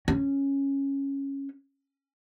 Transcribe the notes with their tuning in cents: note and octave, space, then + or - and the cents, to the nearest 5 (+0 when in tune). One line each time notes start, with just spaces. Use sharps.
C#4 -5